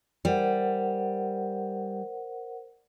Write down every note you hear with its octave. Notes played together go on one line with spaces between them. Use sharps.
G3 A#4 C5 F#5